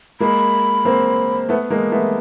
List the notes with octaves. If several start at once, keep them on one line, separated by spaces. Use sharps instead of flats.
G#3 A#3 B5
A#3 C4
A3 B3
G#3 A#3
A3 B3